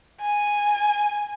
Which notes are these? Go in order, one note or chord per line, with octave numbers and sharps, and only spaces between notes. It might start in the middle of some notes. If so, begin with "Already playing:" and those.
G#5